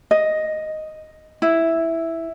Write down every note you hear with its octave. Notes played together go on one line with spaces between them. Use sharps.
D#5
E4